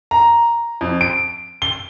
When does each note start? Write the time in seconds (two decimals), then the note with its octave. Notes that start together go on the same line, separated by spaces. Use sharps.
0.11 A#5
0.81 F2
1.01 D7
1.62 G7